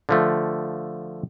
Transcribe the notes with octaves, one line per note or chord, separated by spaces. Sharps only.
D3 F3 A3